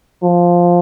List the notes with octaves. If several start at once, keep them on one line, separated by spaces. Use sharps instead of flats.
F3